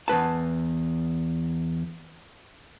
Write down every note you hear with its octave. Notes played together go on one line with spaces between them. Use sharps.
E2 G2 B4 A5